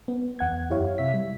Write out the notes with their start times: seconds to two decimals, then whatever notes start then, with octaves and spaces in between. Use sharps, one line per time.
0.08 B3
0.39 E2 F#5 G#6
0.70 F#2 E4 G4 C#5 F5
0.98 C3 E5 B6
1.14 G3